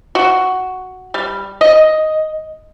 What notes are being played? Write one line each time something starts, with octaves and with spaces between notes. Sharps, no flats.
F#4
G3
D#5